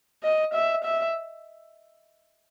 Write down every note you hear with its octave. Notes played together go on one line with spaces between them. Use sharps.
D#5
E5
E5